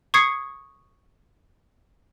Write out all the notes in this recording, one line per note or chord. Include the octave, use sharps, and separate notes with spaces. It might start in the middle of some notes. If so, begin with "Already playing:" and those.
C#6 D#6 G#6 C7 C#7